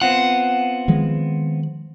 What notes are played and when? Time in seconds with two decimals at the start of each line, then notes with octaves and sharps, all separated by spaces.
0.02 B3 C4 F4 F#5
0.88 D#3 F3 G#3